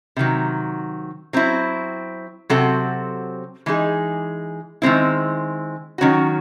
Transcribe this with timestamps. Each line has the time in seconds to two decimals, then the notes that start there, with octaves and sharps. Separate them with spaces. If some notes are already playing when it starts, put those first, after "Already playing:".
0.17 C3 D#3 F#3
1.33 F#3 C4 E4
2.50 C3 F#3 C4 F#4 A4
3.66 E3 G#3 D#4 G#4
4.82 D#3 G#3 C4 E4
5.98 D#3 F#3 C#4 F#4